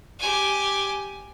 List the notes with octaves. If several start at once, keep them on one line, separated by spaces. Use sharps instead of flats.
G4 G#5